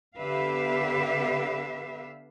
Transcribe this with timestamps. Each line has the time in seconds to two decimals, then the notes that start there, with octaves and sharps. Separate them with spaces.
0.17 D3 B3 G4 B4 E5 F5